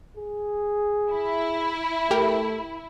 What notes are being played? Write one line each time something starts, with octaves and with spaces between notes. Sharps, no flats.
G#4
E4
A3 G4 A#4 G5